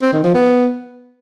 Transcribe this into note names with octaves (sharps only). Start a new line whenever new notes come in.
C4
D#3
F3
B3